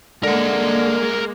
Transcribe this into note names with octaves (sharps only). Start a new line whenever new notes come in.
D3 G#3 A#3 A#4 F#5